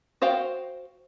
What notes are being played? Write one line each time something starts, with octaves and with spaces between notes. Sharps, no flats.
F#4 C5 F5 G5